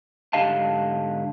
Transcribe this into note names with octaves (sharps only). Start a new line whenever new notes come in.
G#2 D3 G4 D#5 F5 A5